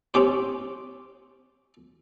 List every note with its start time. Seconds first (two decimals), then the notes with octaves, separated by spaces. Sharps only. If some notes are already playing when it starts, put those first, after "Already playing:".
0.14 C4 C#4 G4 C5